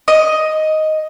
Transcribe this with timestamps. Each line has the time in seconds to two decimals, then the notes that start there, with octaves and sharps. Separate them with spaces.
0.08 D#5